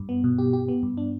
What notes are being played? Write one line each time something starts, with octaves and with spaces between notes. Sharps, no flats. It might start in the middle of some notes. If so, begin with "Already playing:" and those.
Already playing: G2
B3
B2
G4
G4
B3
G2
D4